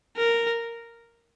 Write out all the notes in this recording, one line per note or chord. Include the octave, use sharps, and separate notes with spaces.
A#4